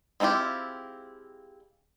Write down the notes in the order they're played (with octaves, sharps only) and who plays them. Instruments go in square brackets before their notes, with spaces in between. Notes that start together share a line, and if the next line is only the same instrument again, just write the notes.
[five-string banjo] G#3 C4 E4 F4 G4